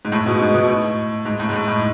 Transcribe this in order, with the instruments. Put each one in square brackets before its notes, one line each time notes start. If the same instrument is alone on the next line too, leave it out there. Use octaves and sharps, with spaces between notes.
[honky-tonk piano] G#2
A2
G#2 B2
G#2
G#2 B2
A2
G#2
A2
G#2
A2
A2